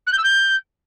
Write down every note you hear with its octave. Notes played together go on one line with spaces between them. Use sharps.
F#6
G6
E6
G6